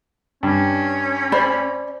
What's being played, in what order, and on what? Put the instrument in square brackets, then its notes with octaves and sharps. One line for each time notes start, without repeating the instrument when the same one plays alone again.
[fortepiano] G2 [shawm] C#4
[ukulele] C5 D5 B5